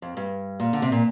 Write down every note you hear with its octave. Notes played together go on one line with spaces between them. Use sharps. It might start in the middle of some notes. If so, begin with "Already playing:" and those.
F2
G2
A#2
D3
C3
A#2